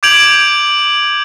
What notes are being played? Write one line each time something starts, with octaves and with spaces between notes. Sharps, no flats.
D6 G6 G#6 D7 F7 F#7